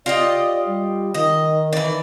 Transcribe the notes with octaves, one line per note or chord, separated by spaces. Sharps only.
F4 G4 D5 D#5
G3
D#3 D#5
E3 D5